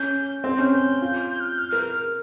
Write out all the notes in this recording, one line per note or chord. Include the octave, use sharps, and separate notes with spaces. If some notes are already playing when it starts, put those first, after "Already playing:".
Already playing: C#4 G6
C4 G6
C#4
G6
F4
G6
F6
G6
F6
A#4